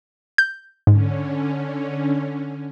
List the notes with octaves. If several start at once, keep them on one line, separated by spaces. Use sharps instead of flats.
G6
G#2 D3 C#4